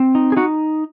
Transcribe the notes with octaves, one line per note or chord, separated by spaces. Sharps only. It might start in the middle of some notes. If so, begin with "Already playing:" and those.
Already playing: C4
D#4
G#4
D#4 F#4